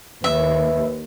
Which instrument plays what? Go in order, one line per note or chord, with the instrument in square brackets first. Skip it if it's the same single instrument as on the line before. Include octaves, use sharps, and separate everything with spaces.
[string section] D#2 [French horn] B4 [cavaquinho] E5